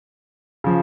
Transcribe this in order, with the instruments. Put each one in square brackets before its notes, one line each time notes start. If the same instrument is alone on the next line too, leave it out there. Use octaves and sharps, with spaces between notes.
[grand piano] C#3 F3